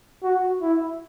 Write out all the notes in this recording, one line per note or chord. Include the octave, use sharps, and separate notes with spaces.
F#4
E4